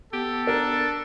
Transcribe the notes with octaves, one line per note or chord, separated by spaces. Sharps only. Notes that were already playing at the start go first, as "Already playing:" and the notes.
B3 G4 A4
D4 A#4